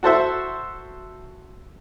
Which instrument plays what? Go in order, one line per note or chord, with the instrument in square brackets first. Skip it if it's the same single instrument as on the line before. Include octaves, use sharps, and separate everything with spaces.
[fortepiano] F#4 A4 C5 E5